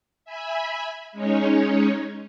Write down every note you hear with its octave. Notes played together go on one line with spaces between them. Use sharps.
E5 G#5 B5
G#3 C#4 D#4 C#5